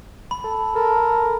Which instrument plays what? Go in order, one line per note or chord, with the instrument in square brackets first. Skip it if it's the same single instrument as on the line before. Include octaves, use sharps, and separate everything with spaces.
[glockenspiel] B5
[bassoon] A4
[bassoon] A4 [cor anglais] A#4